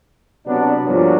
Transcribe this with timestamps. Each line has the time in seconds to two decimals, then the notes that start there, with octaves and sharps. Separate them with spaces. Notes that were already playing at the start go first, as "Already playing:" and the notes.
0.46 C3 F#3 B3 D4
0.86 G2 A#2 F3 F#3 B3 D4